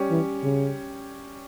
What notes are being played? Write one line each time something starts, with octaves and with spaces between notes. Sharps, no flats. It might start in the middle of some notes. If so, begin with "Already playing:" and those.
Already playing: G3 C#4 G4 C#5
E3
C#3